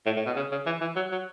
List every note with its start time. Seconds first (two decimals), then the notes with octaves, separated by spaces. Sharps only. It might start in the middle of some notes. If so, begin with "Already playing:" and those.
0.06 A2
0.16 A2
0.26 B2
0.36 C#3
0.52 C#3
0.66 E3
0.81 E3
0.96 F#3
1.12 F#3